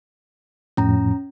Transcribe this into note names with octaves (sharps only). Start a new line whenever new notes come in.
F2 A2 F3 C#4 A#5